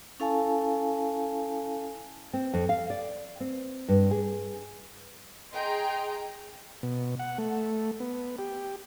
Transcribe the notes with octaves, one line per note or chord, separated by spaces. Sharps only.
C#4 E4 A4 F5 G#5 A5
C4
F2
F5
D5
C4
G2
G#4
G#4 D#5 G5 A#5 C6
B2
F#5
A3
B3
G4